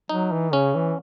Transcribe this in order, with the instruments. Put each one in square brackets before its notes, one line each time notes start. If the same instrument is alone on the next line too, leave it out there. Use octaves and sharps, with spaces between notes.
[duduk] F#3 [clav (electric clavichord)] D#4
[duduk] E3
[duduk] C#3 [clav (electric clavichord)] C#4
[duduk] E3